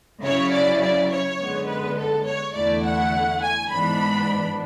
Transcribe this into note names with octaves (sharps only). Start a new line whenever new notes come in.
F#2 C#3 F#3 C#4 E4 C#5
D5
D5
C#5
F#2 D3 G#3 B3
B4
A4
C#5
E2 D3 A3 E4 D5
F#5
G#5
G#2 E3 B3 D4 B5